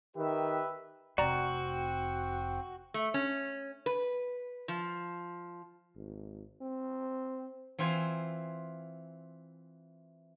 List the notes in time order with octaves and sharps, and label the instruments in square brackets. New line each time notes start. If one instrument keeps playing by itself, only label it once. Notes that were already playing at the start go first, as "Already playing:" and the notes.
[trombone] D#3 [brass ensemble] G4 B4 E5
[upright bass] F1 [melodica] C4 G5 [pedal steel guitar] F#4 [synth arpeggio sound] D5 A#5
[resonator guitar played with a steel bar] A3
C#4
B4
F3
[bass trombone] G#1
C4
[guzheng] E3 C4 F4 C5 G#5